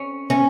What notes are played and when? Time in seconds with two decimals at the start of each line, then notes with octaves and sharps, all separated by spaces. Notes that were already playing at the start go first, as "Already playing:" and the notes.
Already playing: C#4
0.30 C#4